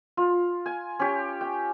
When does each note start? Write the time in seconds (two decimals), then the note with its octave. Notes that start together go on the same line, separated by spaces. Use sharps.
0.17 F4
0.66 G#5
1.00 C#4 G4
1.41 G5